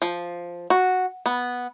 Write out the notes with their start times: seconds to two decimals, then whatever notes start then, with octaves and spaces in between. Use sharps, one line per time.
0.02 F3
0.70 F#4
1.26 B3